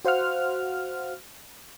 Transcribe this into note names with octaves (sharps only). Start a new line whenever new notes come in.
F#4 C5 F5 F#5 F6